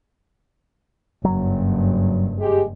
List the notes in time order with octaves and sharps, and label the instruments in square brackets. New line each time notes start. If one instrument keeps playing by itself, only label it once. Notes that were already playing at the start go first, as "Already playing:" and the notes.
[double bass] F#1 G2 [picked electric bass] F#3
[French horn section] G#3 G4